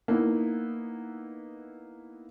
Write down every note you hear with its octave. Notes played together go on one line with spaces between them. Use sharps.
A#3 B3 D#4 E4